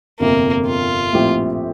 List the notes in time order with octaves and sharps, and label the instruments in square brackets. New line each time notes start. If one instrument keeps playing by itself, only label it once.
[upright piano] G1 F2 C3 [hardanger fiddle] A#3
[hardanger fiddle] F4
[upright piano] A#1 A2 F3 C4 G4